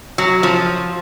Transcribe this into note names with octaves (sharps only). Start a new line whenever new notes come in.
F#3
F3